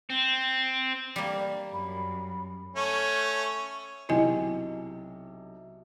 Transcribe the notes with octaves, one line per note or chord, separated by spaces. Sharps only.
C4
G3 A#3
F#2 B5
A3 C#4
B1 C3 E4 D#5 G#5